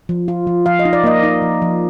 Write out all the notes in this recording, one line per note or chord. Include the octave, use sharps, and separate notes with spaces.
F3
F4
F3
F3 F5
D#5
D#4
D5
A#3 D#5
D#4
F3
F3